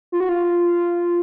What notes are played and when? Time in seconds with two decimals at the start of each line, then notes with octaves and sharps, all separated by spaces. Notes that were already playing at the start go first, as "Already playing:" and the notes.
0.12 F4
0.20 F#4
0.29 F4